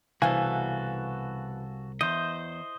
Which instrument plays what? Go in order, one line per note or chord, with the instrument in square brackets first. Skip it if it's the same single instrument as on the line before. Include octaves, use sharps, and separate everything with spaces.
[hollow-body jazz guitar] C2 [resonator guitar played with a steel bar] B2 E3 [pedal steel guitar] F#4 A4 [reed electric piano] F5 G#5
[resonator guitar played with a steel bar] E2 [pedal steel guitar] C5 D#5 [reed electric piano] G6